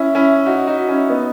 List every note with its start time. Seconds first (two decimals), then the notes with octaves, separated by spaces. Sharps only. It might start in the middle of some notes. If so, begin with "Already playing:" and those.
Already playing: C#4 E4
0.15 C#4 E4
0.46 D#4 F#4
0.67 D#4 F#4
0.88 C#4 E4
1.09 B3 D#4